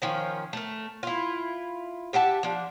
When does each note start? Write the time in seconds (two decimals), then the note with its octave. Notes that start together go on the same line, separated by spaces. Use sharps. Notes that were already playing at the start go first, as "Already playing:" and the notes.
0.02 D#3 F3 C#4
0.53 A3 A#4
1.03 E4 F4
2.13 G4 E5 F#5 A5
2.43 F3 D4